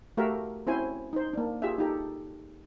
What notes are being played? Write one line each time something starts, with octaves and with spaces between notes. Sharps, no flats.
A3 F#4 G4 A#4 E5 F5
C4 C#4 E4 F#4 C5 G#5
D#4 C5
A#3 D4
F4 G4 G#4 E5
D#4 G4 A4